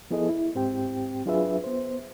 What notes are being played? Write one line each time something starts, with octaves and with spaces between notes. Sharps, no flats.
F3 B3 E4 G#4 A4 D#5
E4
G#2 C4 G4 G5
F#3 D4 F4 G#4 B4 E5
B3 C5